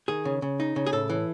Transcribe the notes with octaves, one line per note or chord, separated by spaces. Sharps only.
D#3 G#4
C#3
C#3
D#4
C#3
G#4
A2 A4
E3